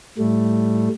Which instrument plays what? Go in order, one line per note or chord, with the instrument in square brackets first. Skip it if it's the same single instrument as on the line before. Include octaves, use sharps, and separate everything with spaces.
[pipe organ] A2 G3 A3